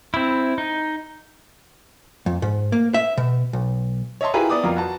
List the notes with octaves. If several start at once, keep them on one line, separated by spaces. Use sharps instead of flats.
C4 E4
D#4
F2
G#2
A#3
E5
B2
B1
C#5 D#5 E5 A5 C6
E4 F4 G4 G#4 A#4 B4
B3 D5 D6 D#6
F2 F4 A#4
F#4 B4 A5